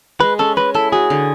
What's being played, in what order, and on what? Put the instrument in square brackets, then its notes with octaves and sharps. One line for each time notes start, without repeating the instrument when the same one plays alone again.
[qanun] G#3 [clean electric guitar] B4
[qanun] C#4 [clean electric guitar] A4
[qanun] G#3 [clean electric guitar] B4
[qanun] E4 [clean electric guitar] A4
[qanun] F#4 [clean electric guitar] G#4
[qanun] D3